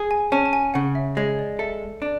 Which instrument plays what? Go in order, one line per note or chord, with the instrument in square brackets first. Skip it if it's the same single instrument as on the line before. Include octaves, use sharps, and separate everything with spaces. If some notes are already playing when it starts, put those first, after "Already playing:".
Already playing: [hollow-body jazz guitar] G#4
[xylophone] G#5
[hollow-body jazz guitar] C#4 [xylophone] A5
[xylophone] A5
G#5
[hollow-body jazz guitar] C#3 [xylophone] F#5
[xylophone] E5
[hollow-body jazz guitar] G#3 [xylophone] C#5
[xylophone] D5
[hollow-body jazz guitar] A4 [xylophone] E5
[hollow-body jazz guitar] D4